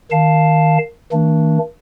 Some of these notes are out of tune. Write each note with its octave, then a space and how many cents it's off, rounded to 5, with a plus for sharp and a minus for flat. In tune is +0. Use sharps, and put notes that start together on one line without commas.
D#3 +0 F5 +0 A5 +0
D#3 +40 A3 +45 D4 +0